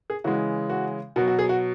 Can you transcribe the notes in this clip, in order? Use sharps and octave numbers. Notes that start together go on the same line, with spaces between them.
G#4
C#3 E3 G#3 F#4
F#4
B2 F#3 F#4
F#4
G#4
F#4